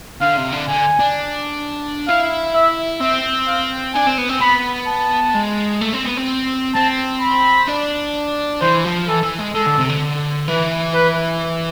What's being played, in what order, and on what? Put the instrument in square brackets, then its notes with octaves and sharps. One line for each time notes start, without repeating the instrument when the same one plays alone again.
[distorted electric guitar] D3 [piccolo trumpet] F5
[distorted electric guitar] C3
D3
[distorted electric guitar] D3 [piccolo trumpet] G#5
[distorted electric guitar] D4
[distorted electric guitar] E4 [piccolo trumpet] F5
[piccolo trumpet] E5
[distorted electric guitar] C4 [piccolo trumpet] E5
[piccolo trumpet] F5
[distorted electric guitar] D4 [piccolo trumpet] G#5
[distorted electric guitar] C4
B3
C4
[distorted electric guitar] B3 [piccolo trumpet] B5
[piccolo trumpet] A5
[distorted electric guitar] G#3
A3
C4
B3
C4
[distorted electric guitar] C4 [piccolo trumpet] A5
[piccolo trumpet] B5
[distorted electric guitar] D4
[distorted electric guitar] E3 [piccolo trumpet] C5
[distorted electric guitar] F3
[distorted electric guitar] E3 [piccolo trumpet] A4
[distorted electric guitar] E3
G#3
[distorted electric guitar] G#3 [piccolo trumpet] A4
[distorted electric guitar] D3
C3
D3
[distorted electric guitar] E3 [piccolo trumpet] B4
[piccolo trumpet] B4